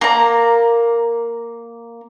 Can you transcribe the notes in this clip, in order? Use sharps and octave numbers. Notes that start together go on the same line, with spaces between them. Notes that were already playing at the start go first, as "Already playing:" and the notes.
A#3 A#5